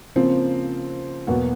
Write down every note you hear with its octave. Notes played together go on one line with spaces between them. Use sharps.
C#3 F3 A#3 C4
E2 B2 F#3 A#3 F#4